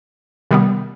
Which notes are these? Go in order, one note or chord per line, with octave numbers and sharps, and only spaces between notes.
C3 D#3 G3 B3